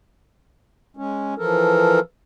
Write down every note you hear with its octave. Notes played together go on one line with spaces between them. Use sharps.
G#3 C#4
E3 F3 A4 A#4